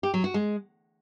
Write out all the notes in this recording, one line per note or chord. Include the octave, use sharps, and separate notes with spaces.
G4
F#3
F#4
G#3